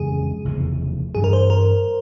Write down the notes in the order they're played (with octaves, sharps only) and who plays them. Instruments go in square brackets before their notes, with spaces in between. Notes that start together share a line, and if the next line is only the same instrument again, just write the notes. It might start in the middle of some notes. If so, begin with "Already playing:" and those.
Already playing: [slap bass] F2 C#3 E3 G#3 [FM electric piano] G#4
[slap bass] F1 E2 C#3 F3
[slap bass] G2 E3 G3 [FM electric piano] G#4
[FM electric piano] A#4
C5
A#4